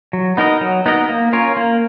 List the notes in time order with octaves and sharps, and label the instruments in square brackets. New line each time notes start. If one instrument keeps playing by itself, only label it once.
[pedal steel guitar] F#3
B3 D#4 A#4 D#5
F#3
B3 D#4 A#4 D#5
A#3
C#4 F4 A#4 C#5
A#3